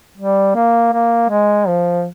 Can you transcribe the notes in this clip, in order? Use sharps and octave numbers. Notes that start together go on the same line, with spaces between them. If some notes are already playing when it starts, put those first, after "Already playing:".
G3
A#3
A#3
G#3
F3